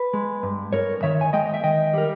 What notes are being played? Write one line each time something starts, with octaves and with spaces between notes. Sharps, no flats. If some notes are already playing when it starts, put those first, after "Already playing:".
Already playing: B4
G#3
G2
G2 A#4 C#5
D#3 C#5 E5
G#5
G#3 D#5 G5
D#5
E5
D#3 D#5 G5
G3 A#4